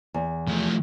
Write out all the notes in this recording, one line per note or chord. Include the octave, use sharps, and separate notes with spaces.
E2
F3 A3